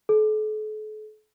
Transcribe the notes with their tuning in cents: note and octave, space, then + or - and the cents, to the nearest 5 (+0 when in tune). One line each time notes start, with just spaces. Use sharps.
A4 -40